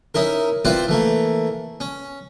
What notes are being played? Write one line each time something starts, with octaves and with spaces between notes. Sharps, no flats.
C#4 D#4 E4 A#4
C4 E4 F4 B4 C5 D5
E3 A3 A#3
C#4